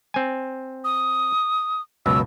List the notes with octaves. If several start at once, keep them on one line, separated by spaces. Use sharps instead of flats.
C4 G#5
D#6
C#2 F#2 B2 E6